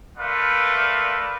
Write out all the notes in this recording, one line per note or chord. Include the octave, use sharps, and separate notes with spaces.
A3 A#4 B4 D5 F5 C6